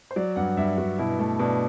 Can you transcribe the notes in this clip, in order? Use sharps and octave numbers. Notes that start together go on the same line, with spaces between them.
C5
F#3 D5
G2 F#5
G2 E5
G2 F#4
B2 E4
A3
B2 D4